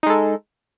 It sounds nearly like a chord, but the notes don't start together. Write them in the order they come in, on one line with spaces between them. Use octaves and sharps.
D#4 G#3 A4